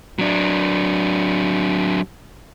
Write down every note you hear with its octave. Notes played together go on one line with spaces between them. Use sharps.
F#3 D4